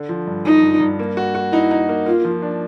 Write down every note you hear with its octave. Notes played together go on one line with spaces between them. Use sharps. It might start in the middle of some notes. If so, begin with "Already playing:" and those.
Already playing: D3
F3
G2
F3 D#4
G2
G2
A#3
F#4
F#4
D#4 E4
D#4
A#3
A#3 F4
F3
D4